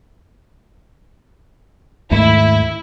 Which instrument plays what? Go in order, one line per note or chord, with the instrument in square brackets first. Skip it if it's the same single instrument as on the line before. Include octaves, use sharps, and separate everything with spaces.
[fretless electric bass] D#2 G#2 A3 [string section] E4